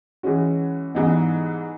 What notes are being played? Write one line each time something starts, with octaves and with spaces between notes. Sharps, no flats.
E3 G#3 C#4 F#4
G#2 E3 G3 B3 D#4